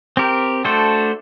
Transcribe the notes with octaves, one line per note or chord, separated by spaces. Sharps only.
C4 G4 A#4
A3 D4 F#4 A4 C5